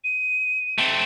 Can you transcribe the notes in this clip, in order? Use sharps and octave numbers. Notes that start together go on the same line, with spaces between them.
D#7
A3 C4